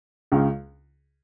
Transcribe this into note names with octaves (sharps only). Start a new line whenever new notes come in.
C#2 C#3